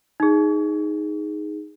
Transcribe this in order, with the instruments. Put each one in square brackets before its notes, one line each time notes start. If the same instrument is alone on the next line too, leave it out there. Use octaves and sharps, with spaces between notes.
[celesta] D#4 G#4